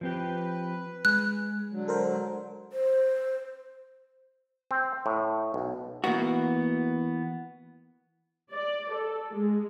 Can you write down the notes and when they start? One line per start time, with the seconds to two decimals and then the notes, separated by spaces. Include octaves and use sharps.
0.01 F3 C4 G4 B4
1.05 G#3 F#6
1.71 D3 F#3
1.88 A4 A#4 C5
2.73 C5
4.71 C4
5.06 A2
5.54 B1
6.04 E3 A#3 B3 F#4
8.51 D5
8.91 A4
9.34 G#3